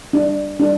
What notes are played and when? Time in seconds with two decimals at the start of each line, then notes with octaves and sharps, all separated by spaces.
0.13 D4
0.60 D4